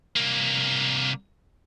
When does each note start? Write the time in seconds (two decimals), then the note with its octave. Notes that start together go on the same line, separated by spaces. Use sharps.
0.16 C2 A#3